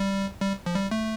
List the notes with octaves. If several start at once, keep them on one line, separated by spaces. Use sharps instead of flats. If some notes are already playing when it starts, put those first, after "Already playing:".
Already playing: G3
G3
F3
G3
A3